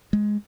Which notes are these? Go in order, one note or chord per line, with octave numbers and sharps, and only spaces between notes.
G#3